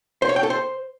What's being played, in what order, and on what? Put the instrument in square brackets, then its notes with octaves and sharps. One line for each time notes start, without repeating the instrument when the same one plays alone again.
[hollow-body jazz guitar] C5
C#5
G5
A4
C5